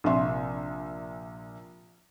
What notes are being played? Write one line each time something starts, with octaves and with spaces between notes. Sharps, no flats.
A#1 C3 E5 C6